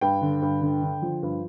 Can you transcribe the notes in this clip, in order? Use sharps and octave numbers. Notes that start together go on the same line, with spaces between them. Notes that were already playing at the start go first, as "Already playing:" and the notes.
G2 G5
D3
G2
D3
D3
F3
G2